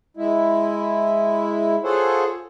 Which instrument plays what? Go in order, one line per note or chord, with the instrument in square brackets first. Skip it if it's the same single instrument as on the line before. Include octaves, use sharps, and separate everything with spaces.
[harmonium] G#3 E4
F4 G#4 A4 C5 C#5 F#5